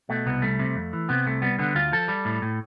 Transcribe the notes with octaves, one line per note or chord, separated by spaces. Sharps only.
B2 A3
C2 B3
G3 A3
C3
F2
E3
C3 B3
C2 A3
G3 B3
D3 B3
D2 F4
F3 A4
G3
A2
A2